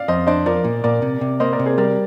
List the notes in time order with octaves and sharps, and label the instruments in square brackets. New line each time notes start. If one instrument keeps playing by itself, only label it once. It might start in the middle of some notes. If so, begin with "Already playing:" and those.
Already playing: [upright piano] D5 F5
[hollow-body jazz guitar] F2 [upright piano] C5 D#5
[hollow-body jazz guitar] D4 [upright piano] C5 D#5
[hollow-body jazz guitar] F3 [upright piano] A#4 D5
[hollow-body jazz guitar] A#2
[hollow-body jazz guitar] A#2 [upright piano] A#4 D5
[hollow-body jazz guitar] C3
C3
[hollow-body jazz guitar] A#3 [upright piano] C5 D#5
[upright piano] A#4 D5
[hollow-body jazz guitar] C3
[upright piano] G#4 C5
[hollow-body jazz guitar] G3 [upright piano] A#4 D5